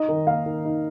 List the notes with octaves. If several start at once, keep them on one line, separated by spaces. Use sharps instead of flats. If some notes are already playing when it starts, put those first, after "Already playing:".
Already playing: D#4 D#5
D#3
A#3 F5
D#3
D#4